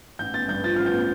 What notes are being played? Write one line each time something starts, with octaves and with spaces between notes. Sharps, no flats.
A1 G6
B3 A6
G2 G6
F3 A6
A1 F6
G6
B3